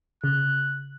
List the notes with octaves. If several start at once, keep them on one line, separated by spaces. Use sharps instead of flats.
C#3 F#6